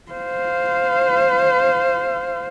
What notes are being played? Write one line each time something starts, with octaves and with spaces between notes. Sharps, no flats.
C5 F5